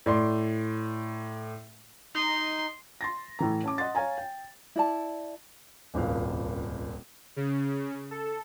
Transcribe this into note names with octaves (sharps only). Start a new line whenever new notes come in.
A2 D5 C6
D#4 C6
C6 A6 A#6
A2 E3 A#5
C#4 A5 D6
D#5 F#5 C6 A6
C#5 F5 G#5 A#5
G5
E4 D5 A5
D#1 G#1 C#2 F5
C#3
A4